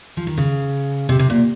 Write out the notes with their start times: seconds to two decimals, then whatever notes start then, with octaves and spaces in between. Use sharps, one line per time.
0.17 F3
0.27 D#3
0.38 C#3
1.09 C3
1.19 C3
1.30 A#2